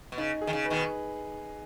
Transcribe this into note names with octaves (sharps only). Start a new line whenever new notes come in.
B2
C#3 D#4
G#4
D#3
C#3
B4
B2 D#3